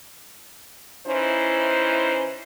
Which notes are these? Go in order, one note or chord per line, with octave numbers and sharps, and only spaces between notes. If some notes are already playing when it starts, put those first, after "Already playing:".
E3 C#4 D#4 E4 C5